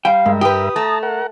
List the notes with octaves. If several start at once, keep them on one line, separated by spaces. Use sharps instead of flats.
G3 F5 G5
G2 G#3 A#4 E5
G4 B4 G5 D#6
A3 A5 A#5
A#4 F#5